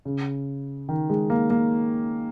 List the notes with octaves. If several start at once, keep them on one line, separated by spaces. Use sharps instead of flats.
C#3
D#3
G#3
A#3
A#3